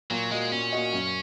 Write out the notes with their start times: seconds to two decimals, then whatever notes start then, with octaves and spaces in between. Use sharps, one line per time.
0.11 A#2 F#3
0.31 G#3 A#3 F#4 D#5
0.52 A#2 C#4
0.73 A#3 F#4 D#5
0.93 F#2